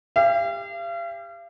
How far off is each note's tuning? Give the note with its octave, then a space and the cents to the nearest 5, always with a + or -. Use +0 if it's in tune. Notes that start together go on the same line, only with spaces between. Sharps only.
G4 +25 F5 -40